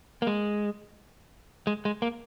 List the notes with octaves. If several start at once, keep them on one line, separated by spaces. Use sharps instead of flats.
A#3
G#3
G#3
G#3
A#3